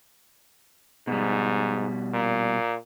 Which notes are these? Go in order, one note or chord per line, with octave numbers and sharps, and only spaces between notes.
G#2 B2 G3
A#2